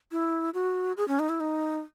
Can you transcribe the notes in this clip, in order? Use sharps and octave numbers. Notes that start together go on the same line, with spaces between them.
E4
F#4
G#4
C#4
D#4
E4
D#4